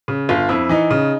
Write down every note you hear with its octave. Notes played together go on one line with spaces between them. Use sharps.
C#3
G1 F4
F2 E4
E3 D#4
C#3